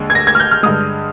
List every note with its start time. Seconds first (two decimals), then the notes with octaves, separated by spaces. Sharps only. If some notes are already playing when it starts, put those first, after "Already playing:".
Already playing: D#2 D3 G#3
0.10 G#6
0.15 A#6
0.27 G#6
0.35 F6
0.40 G6
0.51 F6
0.63 G2 D3 G#3 D#6